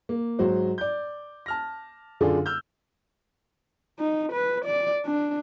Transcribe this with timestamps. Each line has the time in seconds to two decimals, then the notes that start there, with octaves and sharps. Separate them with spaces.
0.09 A#3
0.39 G#2 F#3 F#4 C5
0.78 D5 G6
1.46 A5 F6 A#6
2.21 F#2 D3 D4 F4 G#4 A4
2.46 E6 F6 G6
4.00 D#4
4.33 B4
4.65 D5
5.06 D4